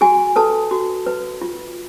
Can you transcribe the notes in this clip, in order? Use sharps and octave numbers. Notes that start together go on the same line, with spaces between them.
F#4 G#4 G#5
A4 B4 A5
F#4
B4
F4